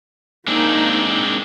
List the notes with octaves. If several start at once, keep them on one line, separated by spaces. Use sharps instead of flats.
G#3 A#3 C4 D4 D#4